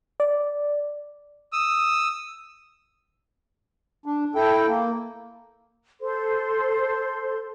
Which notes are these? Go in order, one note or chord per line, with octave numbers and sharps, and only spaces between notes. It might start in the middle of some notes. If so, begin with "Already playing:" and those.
D5
D#6 E6
D4
E4 A4 G5
A#3
A4 C5 C6